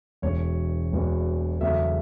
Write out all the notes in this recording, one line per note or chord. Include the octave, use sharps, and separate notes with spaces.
E1 E2 B2 C#5
E1 E2 B2
E1 E2 C#3 F#3 A3 E5